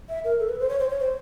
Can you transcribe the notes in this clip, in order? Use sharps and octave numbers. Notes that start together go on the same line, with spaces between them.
E5
A#4
A4
B4
C5
C#5
C5
C#5
C5